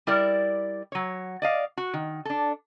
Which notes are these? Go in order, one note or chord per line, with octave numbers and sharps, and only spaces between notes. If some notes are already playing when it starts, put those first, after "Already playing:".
G3 E4 A#4 D5
F#3 C#5
D5 D#5 F5
F#4
D#3
D4 A4